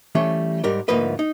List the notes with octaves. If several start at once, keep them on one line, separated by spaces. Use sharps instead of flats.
E3 G3 A3 C#4
G#2 G3 A#4 D5
D2 G#2 F3 A#3 B4 D#5
D#4